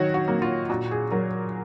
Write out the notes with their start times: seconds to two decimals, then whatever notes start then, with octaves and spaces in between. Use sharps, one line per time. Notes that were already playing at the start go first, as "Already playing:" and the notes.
Already playing: D#3 F#3 F#4 C#5
0.14 F#4
0.28 F#3 A#3
0.42 F4
0.70 A#2 F#4
0.91 G#4
1.12 F#3 A#4